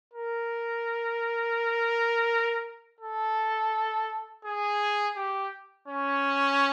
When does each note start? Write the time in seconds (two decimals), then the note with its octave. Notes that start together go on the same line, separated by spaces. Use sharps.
0.13 A#4
3.01 A4
4.45 G#4
5.16 G4
5.88 C#4